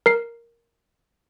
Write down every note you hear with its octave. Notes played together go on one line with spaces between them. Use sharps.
A#4 C7